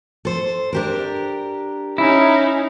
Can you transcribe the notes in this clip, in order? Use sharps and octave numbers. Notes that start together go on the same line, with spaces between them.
A4 C5
D4 G4 A#4
C#4 D#4 E4